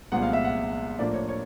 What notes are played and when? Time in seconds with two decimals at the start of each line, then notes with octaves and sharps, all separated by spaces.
0.12 C2 A#2 F3 G#3 B3 F#5
0.23 F5
0.33 E5
0.45 F#5
0.99 A2 F3 A#3 D4 D5
1.14 C#5
1.28 C#5